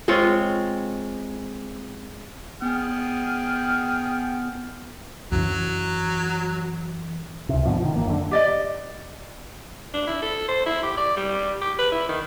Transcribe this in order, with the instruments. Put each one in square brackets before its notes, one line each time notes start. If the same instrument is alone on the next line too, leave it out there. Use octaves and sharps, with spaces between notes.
[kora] G#3 C4 F4 C#5
[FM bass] B3 [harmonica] G#4 G5 F6
[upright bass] F#2 E3 [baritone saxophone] F#3
[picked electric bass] C#2 C3
G#2 B2 D3 F3
D#3 F3
G1 A#3
F#2 D3
[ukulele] G4 D5 D#5
[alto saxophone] D4
E4
A4
C5
E4
G4
D5
G3
G4
B4
E4
D#3